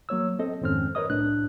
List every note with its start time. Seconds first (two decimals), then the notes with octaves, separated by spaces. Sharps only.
0.09 F#3 A#3 C#5 E6
0.39 C4 A4 D#5
0.61 F2 G#2 D#3 C4 C#4 F6
0.95 A#4 B4 C#5 D#5 D#6
1.10 C2 A2 D4 F#6